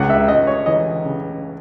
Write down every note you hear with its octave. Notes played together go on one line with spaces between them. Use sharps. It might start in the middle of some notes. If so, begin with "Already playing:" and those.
Already playing: C#2 F#5
E5
C#2 D#5
C#5
E3 D#5
C#3